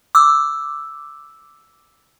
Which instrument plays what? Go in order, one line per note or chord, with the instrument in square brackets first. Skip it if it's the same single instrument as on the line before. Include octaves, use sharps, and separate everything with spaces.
[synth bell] D6 E6